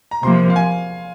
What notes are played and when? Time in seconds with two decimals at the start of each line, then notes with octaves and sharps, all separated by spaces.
0.11 A#5
0.23 C3 F3 A#3 C6
0.50 F5
0.56 G#5